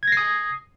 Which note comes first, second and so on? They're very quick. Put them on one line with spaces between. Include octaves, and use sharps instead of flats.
G#6 A#6 C7 D#6